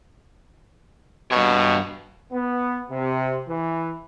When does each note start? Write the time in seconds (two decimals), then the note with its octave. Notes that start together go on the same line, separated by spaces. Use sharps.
1.32 G2 B2 C#5
2.32 B3
2.90 C3
3.48 E3